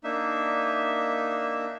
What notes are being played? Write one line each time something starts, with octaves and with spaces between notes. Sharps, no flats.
A#3 D4 D#4 E5